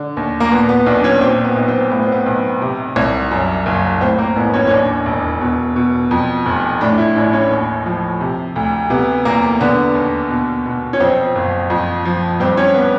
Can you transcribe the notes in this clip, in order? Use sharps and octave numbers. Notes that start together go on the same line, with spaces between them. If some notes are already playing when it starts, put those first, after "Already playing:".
Already playing: D3
D#2
A#3
A#2 B3
B3
B1 D4
C#4
A#2 C4
B3
B1
C4
A2 B3
C4
B3
B1
C3
C2
F#2
F#1
A2 C4
A#3
A1 B3
C#4
C#4
D#2 D4
E1
B2
B2
F2
F1
A2 D4
E4
A1 D4
C#4
D#2
F3
C3
D2
C3 B3
E2 A#3
D3 B3
D#2
B2
B2
C#4
F2 C4
F#1
F2
F3
G2 C4
C#4
B3